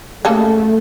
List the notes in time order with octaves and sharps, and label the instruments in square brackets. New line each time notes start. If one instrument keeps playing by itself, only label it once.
[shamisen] C#3 A#3 A4 [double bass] A3